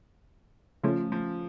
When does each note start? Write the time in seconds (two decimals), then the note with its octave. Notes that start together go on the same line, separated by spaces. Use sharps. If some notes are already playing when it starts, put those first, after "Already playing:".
0.83 C#3 F3 A3 C#4 F4
1.12 F3